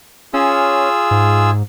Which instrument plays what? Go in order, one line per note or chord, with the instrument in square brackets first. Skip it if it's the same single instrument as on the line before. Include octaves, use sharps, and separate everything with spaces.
[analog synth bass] C#4 [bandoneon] F4 G#4 E6
[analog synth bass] G#2